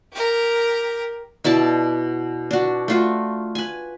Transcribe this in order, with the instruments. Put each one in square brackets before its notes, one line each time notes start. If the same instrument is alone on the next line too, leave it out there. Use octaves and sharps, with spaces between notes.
[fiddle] G4 A#4
[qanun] B2 E4 D5 A5
D4 F#4
A3 F4 F#4
B4 G#5